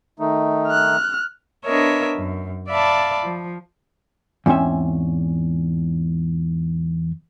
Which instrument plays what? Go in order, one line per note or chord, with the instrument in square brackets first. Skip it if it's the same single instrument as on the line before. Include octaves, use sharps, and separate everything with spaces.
[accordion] D#3 A3 D#4
[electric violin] F6 F#6
[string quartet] B3 D4 A#4 C#5 D#5 E5
F#2
D5 E5 F5 A5 B5
F3
[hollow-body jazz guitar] E2 G#2 C4 C#4 E5